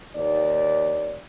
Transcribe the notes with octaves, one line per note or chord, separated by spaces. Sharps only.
D#2 D5